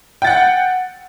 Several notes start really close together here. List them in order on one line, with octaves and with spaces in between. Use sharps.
G5 A6 F#5